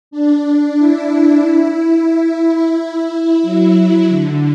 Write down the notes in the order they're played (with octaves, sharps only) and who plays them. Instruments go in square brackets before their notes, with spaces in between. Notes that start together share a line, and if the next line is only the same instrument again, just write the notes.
[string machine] D4
E4
E4
F#3
D3